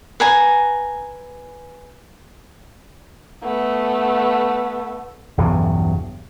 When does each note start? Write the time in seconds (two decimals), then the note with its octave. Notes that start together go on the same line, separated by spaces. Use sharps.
0.20 B4 G#5 A#5
3.43 A3 B3
5.37 B1 E2 G2 C#3